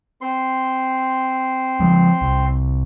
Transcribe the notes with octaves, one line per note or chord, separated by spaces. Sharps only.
C4 C6
F3 G#3
C2